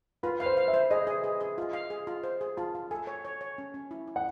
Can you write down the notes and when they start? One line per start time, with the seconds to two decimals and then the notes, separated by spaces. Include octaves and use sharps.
0.23 F4 B4
0.40 B4 F5
0.46 C5
0.57 F5
0.68 E5
0.74 C5
0.90 G#4 D#5
1.07 G#4
1.24 G#4
1.41 G#4
1.58 F4
1.73 F5
1.90 G#4
2.07 F4
2.24 C5
2.41 G#4
2.57 F4 A5
2.75 F4
2.91 A4 G#5
3.07 C#5
3.25 C#5
3.41 C#5
3.58 C#4
3.74 C#4
3.91 E4
4.07 E4
4.16 F#5